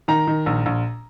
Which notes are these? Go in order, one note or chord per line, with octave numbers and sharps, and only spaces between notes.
D#3 A#5
D#3
A#1
A#1